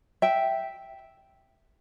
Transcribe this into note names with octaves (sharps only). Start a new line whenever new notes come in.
E5 G5